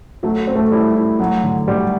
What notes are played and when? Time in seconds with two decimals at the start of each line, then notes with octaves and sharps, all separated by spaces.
0.23 F#3 A3
0.47 C4
0.55 A3
0.71 G3 E4
0.95 E4
1.19 F#3 A3
1.43 D3
1.67 D2 G3